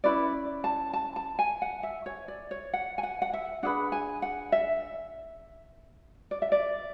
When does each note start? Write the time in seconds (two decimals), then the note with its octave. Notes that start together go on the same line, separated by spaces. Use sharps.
0.04 C#4 E4 B4 D5
0.64 A5
0.93 A5
1.16 A5
1.39 G#5
1.62 F#5
1.83 E5
2.06 C#5
2.28 D5
2.51 C#5
2.73 F#5
2.98 G#5
3.03 F#5
3.22 F#5
3.33 E5
3.63 D4 G#4 B4 F#5
3.92 G#5
4.22 F#5
4.52 E5
6.31 D5
6.42 E5
6.52 D5